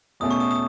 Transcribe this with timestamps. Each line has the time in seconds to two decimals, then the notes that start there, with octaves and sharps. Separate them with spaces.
0.20 E2 B2 A3 C#4 D#6
0.31 C#6
0.40 D#6
0.51 D#6